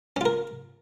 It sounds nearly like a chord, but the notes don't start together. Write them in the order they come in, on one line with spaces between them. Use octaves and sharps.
C#4 F4 A#4